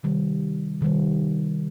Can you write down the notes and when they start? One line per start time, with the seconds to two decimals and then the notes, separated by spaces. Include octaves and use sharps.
0.03 C3 D#3 G3
0.81 C3 D#3 G3